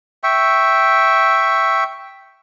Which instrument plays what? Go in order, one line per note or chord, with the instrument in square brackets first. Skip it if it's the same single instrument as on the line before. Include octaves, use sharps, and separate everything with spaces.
[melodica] E5 G5 C#6